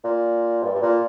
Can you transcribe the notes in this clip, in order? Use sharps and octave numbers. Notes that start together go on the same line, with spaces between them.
A#2
G2
G2
A#2